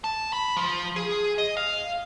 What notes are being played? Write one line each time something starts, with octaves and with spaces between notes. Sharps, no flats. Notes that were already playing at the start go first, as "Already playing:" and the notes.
A5
B5
F3
G#4
D#5
F5